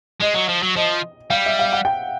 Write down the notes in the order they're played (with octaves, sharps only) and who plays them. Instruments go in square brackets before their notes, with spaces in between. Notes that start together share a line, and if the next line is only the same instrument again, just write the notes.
[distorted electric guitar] G#3 [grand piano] D#5
[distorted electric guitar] F#3
F3
F#3
[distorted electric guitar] F3 [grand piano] D#5
[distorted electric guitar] G3 [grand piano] F5
[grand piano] E5
F5
F#5
G5